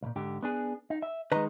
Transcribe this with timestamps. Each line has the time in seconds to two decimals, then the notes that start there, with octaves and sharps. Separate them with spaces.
0.02 C2 A#2
0.16 G#2 D3 G4
0.43 B3 D4 G#4
0.90 D#4
1.02 E5
1.32 D#3 G#3 B4 D#5 A#5